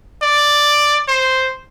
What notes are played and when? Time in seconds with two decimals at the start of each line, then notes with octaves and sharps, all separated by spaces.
0.22 D5
1.08 C5